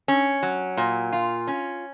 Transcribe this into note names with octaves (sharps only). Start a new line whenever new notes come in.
C#4
F#3
A#2
F4
C#4